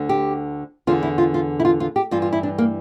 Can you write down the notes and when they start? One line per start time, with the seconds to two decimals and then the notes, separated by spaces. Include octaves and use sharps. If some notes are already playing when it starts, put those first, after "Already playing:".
Already playing: D2 D3
0.09 G4
0.87 E2 D3 F4
1.03 E4
1.18 F4
1.34 F4
1.60 E4
1.65 F4
1.80 F4
1.96 G4
2.11 G2 E3 F4
2.22 F4
2.33 E4
2.43 D4
2.58 A#3